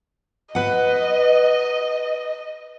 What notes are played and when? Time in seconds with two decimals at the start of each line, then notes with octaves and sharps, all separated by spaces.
0.55 B4 D#5 F#5